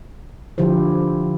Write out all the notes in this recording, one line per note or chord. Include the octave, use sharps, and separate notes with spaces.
D3 F3 E4 G4 C5